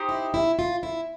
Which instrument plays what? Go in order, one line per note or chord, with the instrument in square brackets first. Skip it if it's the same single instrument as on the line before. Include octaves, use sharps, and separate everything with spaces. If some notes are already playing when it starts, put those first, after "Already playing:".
Already playing: [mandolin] D#4 G4 C5
[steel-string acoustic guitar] E4
E4
F4
E4